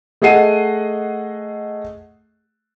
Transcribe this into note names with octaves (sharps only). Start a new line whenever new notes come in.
A3 G#4 D#5 F#5 C7 D#7